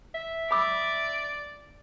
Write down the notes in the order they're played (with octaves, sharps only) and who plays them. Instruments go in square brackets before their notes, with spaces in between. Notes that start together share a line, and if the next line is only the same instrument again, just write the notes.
[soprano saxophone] E5
[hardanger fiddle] D5 [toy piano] B5 D6 E6